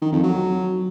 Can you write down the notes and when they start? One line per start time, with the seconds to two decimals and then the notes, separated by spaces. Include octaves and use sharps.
0.02 D#3
0.12 F2
0.23 F#3